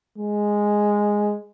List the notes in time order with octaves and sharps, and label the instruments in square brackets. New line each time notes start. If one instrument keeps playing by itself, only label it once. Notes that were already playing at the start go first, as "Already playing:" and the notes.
[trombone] G#3